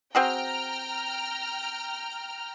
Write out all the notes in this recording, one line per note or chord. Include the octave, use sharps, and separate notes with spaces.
C4 F#4 G#4 G5 A#5 F6